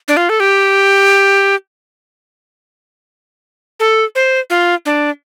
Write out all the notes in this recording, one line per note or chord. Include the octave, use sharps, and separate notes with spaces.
D4
F4
A4
G4
A4
C5
F4
D4